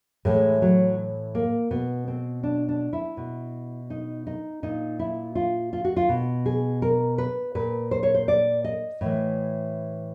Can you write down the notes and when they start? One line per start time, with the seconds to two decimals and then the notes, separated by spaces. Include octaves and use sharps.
0.25 A2 E3 G#3
0.62 F#3
1.35 A#3
1.71 B2 B3
2.08 C4
2.43 D4
2.69 D4
2.93 E4
3.17 B2
3.90 D#4
4.27 D#4
4.63 A#2 D#4
4.99 E4
5.35 F4
5.73 F4
5.85 F#4
5.97 F4
6.09 B2
6.46 G#4
6.82 A#4
7.18 B4
7.55 A#2 B4
7.91 C5
8.03 C#5
8.14 C5
8.28 D5
8.64 D#5
9.01 A2 E3